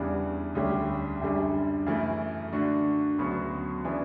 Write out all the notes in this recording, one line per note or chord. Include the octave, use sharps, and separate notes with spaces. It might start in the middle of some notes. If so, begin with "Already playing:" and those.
Already playing: E2 C#3 E3 G3 D4
D2 C#3 G3 C#4 G4
F#2 D3 G3
F#2 C#3 E3 A3 E4
D3 A3 D4 F#4
D2 C#3 F#3 B3 F#4
C#3 E3 B3 D4